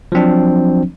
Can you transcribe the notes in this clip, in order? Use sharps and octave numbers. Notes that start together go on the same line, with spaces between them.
F3 F#3 C4 D4